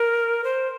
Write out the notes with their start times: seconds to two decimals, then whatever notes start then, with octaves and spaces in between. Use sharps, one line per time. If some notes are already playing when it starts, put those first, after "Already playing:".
Already playing: A#4
0.44 C5